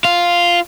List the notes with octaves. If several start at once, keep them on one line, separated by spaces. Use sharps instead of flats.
F4